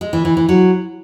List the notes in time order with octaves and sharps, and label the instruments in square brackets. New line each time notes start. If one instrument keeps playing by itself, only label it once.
[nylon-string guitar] G#3
E3
E3
E3
F#3